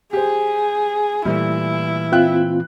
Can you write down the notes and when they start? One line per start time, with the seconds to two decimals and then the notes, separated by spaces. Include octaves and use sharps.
0.13 G4 G#4 C5
1.25 A#2 E3 G3 A3 E4
2.12 C4 F4 E5 G5 F#6